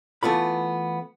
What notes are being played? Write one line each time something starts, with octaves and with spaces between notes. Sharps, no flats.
E3 A3 B3 F4 B5